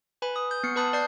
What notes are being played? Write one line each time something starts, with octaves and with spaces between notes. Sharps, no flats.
B4 G#5 B5
D#6
G6
B3 C7 C#7
B4 A5 B5 D#6 F#6
D5 G6 C7